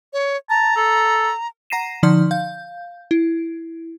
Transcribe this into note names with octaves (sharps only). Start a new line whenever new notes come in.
C#5
A5 A#5
A4
F#5 A#5 A#6 C7 D#7 E7
D3 F3 D#4 D5 C6 F6
F5 G6
E4